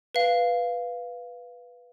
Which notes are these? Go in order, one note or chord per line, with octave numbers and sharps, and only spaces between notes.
B4 F5